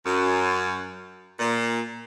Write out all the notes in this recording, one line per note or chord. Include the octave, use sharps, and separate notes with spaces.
F#2
A#2